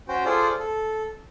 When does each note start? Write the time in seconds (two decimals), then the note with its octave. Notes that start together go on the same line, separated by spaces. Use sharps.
0.08 C#4 F#4 C5 G5
0.25 F4 G#4 A4 C5 D5
0.59 A4